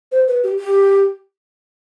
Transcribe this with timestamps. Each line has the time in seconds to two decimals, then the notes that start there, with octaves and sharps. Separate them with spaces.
0.12 C5
0.28 B4
0.44 G4
0.59 G4